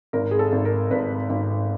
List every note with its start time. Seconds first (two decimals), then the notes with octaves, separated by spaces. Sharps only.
0.13 G#1 A#4
0.31 G#4
0.39 A4
0.52 G#1
0.65 A#4
0.90 G#1 B4
1.29 G#1